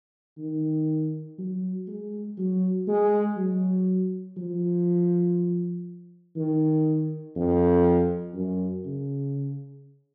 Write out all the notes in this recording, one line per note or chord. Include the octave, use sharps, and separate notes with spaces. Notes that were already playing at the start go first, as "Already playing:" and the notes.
D#3
F#3
G#3
F#3
G#3
F#3
F3
D#3
F2
F#2
C#3